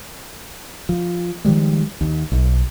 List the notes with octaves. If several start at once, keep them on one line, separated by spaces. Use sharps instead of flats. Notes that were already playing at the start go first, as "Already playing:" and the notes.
F3
D#3 F3 G3 G#3
D#2
B1